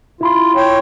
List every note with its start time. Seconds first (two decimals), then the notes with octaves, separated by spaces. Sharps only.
0.21 E4 F4 B5 C6
0.56 C#5 G5